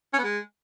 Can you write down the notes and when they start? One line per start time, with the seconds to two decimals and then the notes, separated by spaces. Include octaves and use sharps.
0.13 C#4
0.19 B3
0.24 G#3